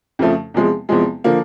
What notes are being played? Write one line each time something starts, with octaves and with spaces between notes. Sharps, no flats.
F2 C#3 F3 A3
E2 C3 F3 G#3
E2 C3 F3 G#3
D3 F3 A#3